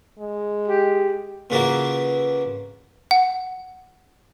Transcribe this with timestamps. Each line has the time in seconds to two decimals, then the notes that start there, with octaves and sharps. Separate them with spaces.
0.19 G#3
0.68 G4
1.50 A#2 C#3 E3 A#3 F#4
3.11 F#5